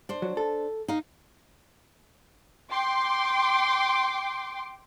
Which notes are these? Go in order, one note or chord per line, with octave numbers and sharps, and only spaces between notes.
D4 C5
F#3
A4
D#4 F5
G5 C6 D6